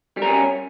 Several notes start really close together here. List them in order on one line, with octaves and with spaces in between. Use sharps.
G3 A#4 C#4